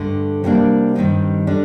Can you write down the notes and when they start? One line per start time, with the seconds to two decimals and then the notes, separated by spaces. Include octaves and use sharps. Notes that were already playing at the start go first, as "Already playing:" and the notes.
Already playing: G2 D3 A3
0.44 C3 G3 A#3 D4
0.95 G2 D#3 G3 C4 D#4
1.47 D3 G3 D4